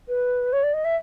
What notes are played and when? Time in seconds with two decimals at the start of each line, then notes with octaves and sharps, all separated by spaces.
0.09 B4
0.53 C#5
0.63 D5
0.74 D#5
0.85 E5